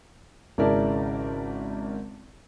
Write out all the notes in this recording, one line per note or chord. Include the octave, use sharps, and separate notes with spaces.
G#1 C#3 E4 A#4 D5 A5